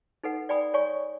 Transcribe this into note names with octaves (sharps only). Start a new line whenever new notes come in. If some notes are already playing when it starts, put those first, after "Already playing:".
D#4 A4 B4 F#5
D5 G5 G#5 B5 D#6
C#5 D5 G#5 C#6